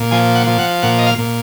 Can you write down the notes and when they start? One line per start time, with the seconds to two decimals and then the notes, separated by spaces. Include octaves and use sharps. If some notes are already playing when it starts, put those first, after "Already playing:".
Already playing: A#2
0.11 F3 G#5
0.35 F#5
0.47 F3
0.59 F#5
0.83 A#2 F#5
0.99 D#5
1.07 F5
1.18 A#2